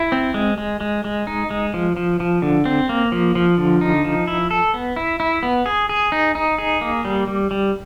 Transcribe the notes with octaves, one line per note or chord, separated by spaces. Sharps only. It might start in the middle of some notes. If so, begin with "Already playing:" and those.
Already playing: E4
C4
G#3
G#3
G#3
G#3
D#4
G#3
F3
F3
F3
D3
C4
A#3
F3
F3
D3
D#4
F3
E4
A4
B3
E4
E4
B3
G#4
G#4
D#4
D#4
G#4
A#3
G3
G3
G3